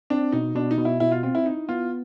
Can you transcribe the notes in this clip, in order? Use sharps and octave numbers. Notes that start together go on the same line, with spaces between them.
C4 D4
B2 D#4
B2 D4
D#4
B2
E4
B2 E4
F4
C4 F4
E4
D#4 E4
B3 F4